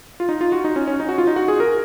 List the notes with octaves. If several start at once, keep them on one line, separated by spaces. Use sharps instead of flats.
F4
D#4
F4
F#4
D#4
C#4
C#4
D#4
F#4
F4
D#4
F#4
G#4
A#4